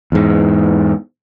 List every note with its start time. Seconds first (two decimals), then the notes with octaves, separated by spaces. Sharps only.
0.12 E2 G#2